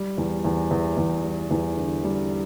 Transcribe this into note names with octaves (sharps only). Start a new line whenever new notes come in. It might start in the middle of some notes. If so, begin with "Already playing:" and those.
Already playing: G3
E2
E2
E2
E2
G3
E2
D3
G3